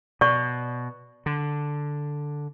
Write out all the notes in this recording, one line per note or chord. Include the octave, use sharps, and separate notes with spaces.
B2 D5 C#6
D3